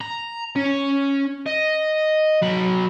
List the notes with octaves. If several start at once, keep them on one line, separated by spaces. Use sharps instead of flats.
A#5
C#4
D#5
F#3 B5